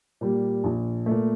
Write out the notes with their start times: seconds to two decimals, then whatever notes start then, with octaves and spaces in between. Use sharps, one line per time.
0.21 A#2 G3
0.64 A#1
1.06 A#2 A3